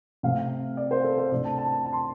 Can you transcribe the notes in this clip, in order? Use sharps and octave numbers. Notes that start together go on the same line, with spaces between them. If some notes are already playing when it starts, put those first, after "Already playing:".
C3 A3 C4 F5
D5
C5
A4
C5
C3 A3 D4 D5
A5
A5
A5
A5
C6